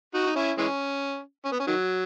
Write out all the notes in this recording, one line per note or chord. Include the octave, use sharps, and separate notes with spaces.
D#4 F#4
D#4
C#4 E4
E3 G#3 C#4
C#4
B3
C#4
D#3 F#3